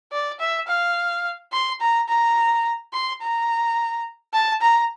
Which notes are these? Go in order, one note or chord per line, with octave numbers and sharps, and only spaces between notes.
D5
E5
F5
C6
A#5
A#5
C6
A#5
A5
A#5